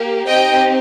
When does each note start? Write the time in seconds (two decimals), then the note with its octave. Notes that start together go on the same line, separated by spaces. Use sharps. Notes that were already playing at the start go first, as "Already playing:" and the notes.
Already playing: A#3 G4
0.27 C4 D#4 G4 D#5 G5